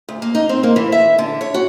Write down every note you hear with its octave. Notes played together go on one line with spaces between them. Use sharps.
D2
A#3
D#4
C4
A#3
E3
E5
D3
C#5
F#4